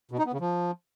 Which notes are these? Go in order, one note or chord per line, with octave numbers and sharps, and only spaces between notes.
B2
D#4
B3
C#3
F3